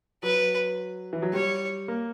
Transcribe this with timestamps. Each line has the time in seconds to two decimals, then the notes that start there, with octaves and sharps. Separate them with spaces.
0.23 F#3 B4
1.13 E3
1.22 F#3
1.33 G3 C#5
1.88 A#3